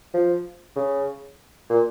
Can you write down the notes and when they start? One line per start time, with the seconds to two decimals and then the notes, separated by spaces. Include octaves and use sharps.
0.14 F3
0.76 C#3
1.70 A#2